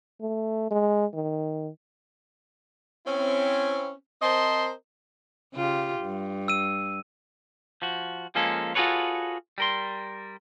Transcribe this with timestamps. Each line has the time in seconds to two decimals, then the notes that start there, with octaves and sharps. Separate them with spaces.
0.21 A3
0.71 G#3
1.14 D#3
3.07 C4 C#4 E4
4.22 C4 A#4 C5 D#5 A5 C6
5.54 C#3 F4 G4
6.01 G2
6.48 E6 D#7
7.82 F3 F#4
8.35 F3 G#3 A#3 C#4 A4
8.75 F4 F#4 G#4 A4 B4 C#5
9.58 G3 A#4 C6